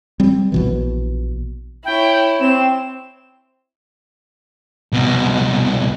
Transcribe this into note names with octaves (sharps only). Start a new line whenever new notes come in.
G3 C4
A#1 B2 E3
E4 C#5 G5
C4 E7
C2 B2